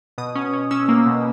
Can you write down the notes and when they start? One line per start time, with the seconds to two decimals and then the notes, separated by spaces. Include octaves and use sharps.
0.18 B2 D#6
0.35 C#4
0.53 C#4
0.71 C#4 E6
0.89 A#3
1.06 B2